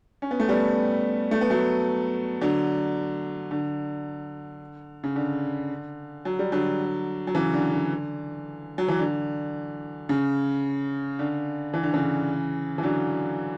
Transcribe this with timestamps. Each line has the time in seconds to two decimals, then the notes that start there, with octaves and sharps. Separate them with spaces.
0.22 C#4
0.31 B3
0.40 A3
0.49 G3 B3
1.31 A3
1.41 B3
1.50 F#3 A3
2.41 D3 F#3
3.51 D3
5.04 C#3
5.16 D3
6.25 F#3
6.39 G3
6.52 D3 F#3
7.27 F#3
7.35 C#3 E3
7.54 D3
7.72 D3
8.78 F#3
8.88 E3
8.99 D3
10.09 C#3
11.19 D3
11.74 E3
11.83 D3
11.94 C#3 E3
12.78 E3
12.83 D3 F#3